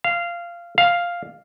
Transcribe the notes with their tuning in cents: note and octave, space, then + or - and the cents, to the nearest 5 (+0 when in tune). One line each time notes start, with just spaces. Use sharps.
F5 -15
F5 +0